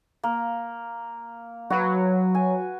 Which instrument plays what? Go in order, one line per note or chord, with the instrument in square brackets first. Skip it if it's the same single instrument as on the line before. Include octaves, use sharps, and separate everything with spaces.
[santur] A#3
[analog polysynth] F#3 [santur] F#4 B4
[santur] G#5